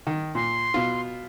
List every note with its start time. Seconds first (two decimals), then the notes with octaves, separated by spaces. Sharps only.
0.07 D#3
0.35 A#2 C6
0.74 B2 F4